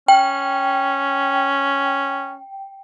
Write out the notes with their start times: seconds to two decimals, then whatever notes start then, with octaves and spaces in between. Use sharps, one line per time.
0.08 C#4 G5